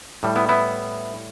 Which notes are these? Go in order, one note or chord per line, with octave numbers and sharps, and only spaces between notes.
A2 G3
B3 E4
B3 E4